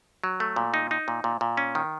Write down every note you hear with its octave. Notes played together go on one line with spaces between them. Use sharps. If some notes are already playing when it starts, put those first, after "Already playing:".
F#3
A3
A#2
D#4
D#4
A#2
A#2
A#2
C#4
D#3